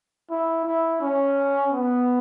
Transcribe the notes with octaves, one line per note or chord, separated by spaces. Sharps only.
E4
E4
C#4
B3